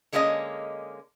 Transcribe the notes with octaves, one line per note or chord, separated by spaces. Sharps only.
D3 G#3 A#3 C#4 E4 D#5